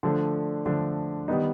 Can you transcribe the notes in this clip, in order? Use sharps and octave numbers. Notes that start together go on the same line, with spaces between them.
D3 F3 A3 D4
D3 F3 A3 D4
D#3 G3 B3 D#4